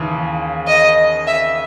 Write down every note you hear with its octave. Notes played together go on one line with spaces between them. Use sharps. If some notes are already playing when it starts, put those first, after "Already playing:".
Already playing: D#2 C#3 E3
D#5
E5